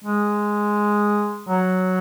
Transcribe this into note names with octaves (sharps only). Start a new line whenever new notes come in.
G#3
F#3